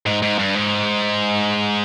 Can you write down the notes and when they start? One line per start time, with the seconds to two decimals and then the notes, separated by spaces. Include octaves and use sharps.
0.06 G#2
0.22 G#2
0.39 G2
0.55 G#2